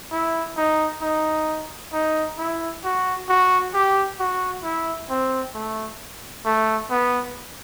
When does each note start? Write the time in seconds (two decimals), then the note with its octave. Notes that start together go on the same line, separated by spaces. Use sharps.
0.12 E4
0.57 D#4
1.02 D#4
1.93 D#4
2.38 E4
2.84 F#4
3.29 F#4
3.74 G4
4.19 F#4
4.63 E4
5.10 C4
5.55 A3
6.45 A3
6.90 B3